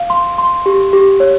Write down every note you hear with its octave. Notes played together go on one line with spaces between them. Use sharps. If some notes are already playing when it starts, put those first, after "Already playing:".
Already playing: F5
C6
C6
G4
G4
C#5